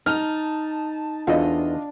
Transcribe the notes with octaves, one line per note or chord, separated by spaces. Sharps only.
D#4 A5 F6
E2 D4 F4 A4 C5 D#5